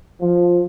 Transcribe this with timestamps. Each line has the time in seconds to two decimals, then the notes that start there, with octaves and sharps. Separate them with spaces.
0.22 F3